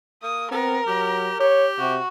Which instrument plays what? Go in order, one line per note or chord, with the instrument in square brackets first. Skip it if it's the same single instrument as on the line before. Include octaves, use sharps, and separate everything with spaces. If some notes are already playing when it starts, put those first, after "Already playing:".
[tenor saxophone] A#3 [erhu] D#6
[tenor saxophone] B3 [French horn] C4 [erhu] A#4
[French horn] F#3 [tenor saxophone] G4
[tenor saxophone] G4 [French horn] C#5
[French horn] C3 [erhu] F#4